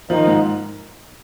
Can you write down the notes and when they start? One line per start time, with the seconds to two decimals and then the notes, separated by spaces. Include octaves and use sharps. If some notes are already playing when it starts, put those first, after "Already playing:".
0.10 D#3 F3 D#4
0.27 G#2